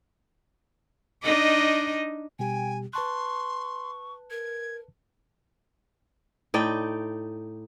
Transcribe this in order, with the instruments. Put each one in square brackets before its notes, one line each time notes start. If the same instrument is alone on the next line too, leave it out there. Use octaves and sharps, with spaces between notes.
[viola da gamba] D4 D#4 D#5
[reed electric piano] B2 G3 G4 [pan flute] G5 [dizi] G#5
[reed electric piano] B4 A5 F#6 [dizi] C6 [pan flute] C#6
[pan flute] A#4 [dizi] G#6
[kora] A2 D#4 D5 G5